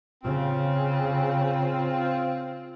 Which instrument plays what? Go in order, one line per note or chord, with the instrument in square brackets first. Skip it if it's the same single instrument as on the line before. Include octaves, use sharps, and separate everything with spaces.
[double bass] C#3 [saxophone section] C4 F4